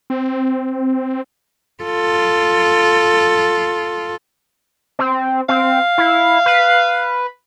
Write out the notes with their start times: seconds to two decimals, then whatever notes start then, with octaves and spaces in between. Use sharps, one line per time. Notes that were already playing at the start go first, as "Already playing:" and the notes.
0.10 C4
1.83 F4 A4
4.99 C4
5.49 C4 F5
5.98 E4
6.46 B4